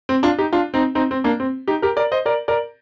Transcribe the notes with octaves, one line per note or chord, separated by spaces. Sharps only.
C4
D4 F4
D#4 G4
D4 F4
C4 D#4
C4 D#4
C4
A#3 D4
C4
D#4 G4
G4 A#4
A#4 D5
C5 D#5
A#4 D5
A#4 D5